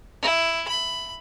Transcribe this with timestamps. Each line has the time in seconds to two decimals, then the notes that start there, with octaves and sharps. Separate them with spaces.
0.22 E4
0.68 B5